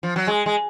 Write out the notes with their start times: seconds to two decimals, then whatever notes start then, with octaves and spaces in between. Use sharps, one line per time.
0.03 F3
0.16 F#3
0.27 G#3
0.46 G#3